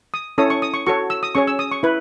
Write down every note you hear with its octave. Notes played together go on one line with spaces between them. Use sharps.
D#6
C#4 E4 A4 C#5 D#6
C#6
D#6
C#6
F#4 A4 C#5 C#6
E6
D#6
C#4 G#4 C#5 C#6
E6
D#6
C#6
E4 B4